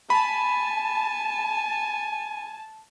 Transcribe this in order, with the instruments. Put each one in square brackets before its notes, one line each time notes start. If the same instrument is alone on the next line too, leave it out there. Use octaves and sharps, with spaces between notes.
[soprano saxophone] G#5 [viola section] A5 [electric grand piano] B5